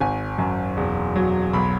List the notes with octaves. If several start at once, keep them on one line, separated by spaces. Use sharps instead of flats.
G#1 G#5
F#2
E1
F#3
B1 B5